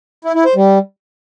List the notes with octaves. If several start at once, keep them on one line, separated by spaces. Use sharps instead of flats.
E4
E4
C5
G3